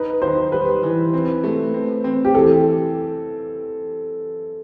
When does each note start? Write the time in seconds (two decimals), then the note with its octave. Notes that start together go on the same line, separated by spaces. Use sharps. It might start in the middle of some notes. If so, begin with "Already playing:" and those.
Already playing: D#4 B4
0.22 D#3 C5
0.51 G3 B4
0.83 E3
1.14 C4
1.44 A3
1.74 C4
2.04 C4
2.25 G4
2.34 E3 A4